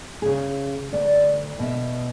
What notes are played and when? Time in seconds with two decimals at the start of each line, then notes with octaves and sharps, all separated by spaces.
0.22 C#3 G#4
0.93 D2 D5
1.59 B2 E5